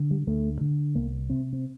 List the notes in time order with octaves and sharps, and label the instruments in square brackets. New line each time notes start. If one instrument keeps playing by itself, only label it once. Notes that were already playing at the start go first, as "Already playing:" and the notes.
Already playing: [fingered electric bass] D3
G3
D2 A3
D3
C2 A#3
C3 C4
C4